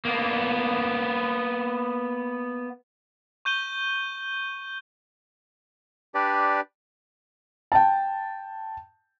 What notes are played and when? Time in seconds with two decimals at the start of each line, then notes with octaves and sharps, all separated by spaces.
0.05 A#3 B3
3.45 C#6 G6 D#7 G7
6.14 D4 G4 B4 D5
7.72 G5 A5